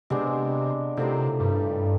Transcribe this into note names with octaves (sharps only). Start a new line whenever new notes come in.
C3 G#3 B3 D4
A2 C3 F3 A#3 D#4
G2